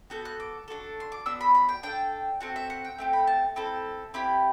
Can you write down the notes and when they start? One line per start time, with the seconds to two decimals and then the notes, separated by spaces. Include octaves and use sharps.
0.10 B3 F#4 A4 G6
0.25 F#6
0.40 D6
0.68 D4 F#4 A4
1.00 C6
1.12 D6
1.26 B3 D4 F#4 E6
1.41 B5
1.55 B5
1.69 G5
1.83 D4 A4 G5
2.40 C4 F#4 A4 F#5
2.56 E5
2.70 F#5
2.85 G5
2.98 A3 C4 G4
3.13 B5
3.27 A5
3.56 C4 E4 A4
4.14 C4 E4 G4 B5